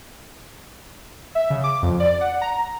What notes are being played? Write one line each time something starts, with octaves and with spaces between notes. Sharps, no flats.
E5
C#3
D6
F2
D5
F#5
A#5